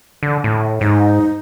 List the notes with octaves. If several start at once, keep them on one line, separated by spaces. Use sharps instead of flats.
D3
A2
G#2 D#4